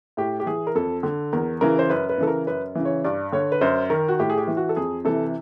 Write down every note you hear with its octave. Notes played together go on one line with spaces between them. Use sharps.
A2 G4
G4
E3 G#4
A#4
F2 A4
D3
E2 A#4
C#3 E3 A#4
C5
F#2 B4
B4
C#3 E3 A4
A#4
F#2 B4
C#3 E3
C#5
G2 D5
D3 C#5
B4
F#2 C5
D#3 A#4
F#4
A2 G4
G#4
G4
E3
F#4
A4
F2 G#4
C3 E3 A4